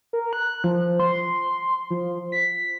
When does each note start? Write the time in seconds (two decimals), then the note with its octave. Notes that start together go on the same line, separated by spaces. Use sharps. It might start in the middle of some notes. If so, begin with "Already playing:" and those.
0.13 A#4
0.33 F#6
0.64 F3
1.00 C6
1.91 F3
2.32 B6